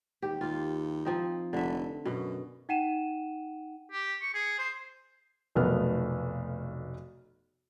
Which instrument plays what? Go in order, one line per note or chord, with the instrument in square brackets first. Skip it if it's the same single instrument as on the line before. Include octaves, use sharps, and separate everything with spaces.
[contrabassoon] D#2 [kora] G4
[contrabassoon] D#2 [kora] F4
[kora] F3 C4 D#4
[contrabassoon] F1 [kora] D3 E5
[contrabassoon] F#2 [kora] B2
[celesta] D#4 F#5 G5 D#7 E7
[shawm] G4
C#6
G#4
C5
[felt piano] F1 B1 A3 B3 A#4 F6